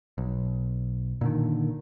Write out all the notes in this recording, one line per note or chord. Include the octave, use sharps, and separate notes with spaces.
B1
A#2 D3 D#3